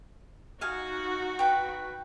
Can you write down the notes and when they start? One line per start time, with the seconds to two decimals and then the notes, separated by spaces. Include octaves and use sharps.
0.61 D#4 F#4 D#5 F5 G#5
1.39 B4 G5